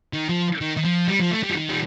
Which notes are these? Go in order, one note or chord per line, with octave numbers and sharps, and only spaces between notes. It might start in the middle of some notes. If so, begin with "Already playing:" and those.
D#3
F3
D#3
D#3
F3
G3
F3
A3
G3
F3
D#3
G3